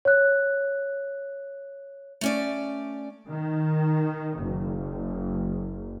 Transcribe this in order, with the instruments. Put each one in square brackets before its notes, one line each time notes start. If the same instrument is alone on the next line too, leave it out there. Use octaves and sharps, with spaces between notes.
[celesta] C#5 F#6
[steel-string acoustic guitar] A3 C#4 D5
[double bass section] D#3
F#1